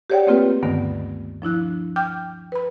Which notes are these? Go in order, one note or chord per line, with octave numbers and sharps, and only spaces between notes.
G4 G#4 C#5 D5 F#5 G5
A3 A#3 C4 F4 G4 B4
D2 G2 D3 D#3 A3 B3
F3 D4 E4 F#6
G5 D6 F6 G6
B4 B5